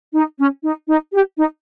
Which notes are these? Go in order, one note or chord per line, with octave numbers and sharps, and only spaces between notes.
D#4
C#4
D#4
D#4
G4
D#4